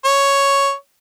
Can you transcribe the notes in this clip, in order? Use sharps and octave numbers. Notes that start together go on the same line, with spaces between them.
C#5